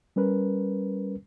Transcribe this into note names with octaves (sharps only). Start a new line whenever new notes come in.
G3 C#4 A#4 B4